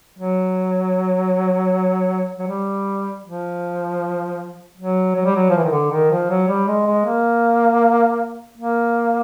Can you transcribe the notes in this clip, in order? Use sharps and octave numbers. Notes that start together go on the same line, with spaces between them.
F#3
F#3
G3
F3
F#3
F#3
G3
F#3
F3
E3
D#3
D3
D#3
F3
F#3
G3
G#3
G#3
A#3
A#3